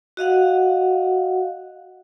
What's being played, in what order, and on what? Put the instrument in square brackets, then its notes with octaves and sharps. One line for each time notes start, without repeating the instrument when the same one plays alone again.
[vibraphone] F#4 D#5 F5 F#5